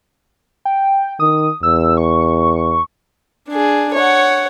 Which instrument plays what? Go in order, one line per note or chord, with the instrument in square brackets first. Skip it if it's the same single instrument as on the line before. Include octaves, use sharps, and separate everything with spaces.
[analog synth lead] G5
[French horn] D#3 [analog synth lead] D#6
[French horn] E2 [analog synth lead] E6
[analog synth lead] C#6
[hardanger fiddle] D4 G#4
C#5 F#5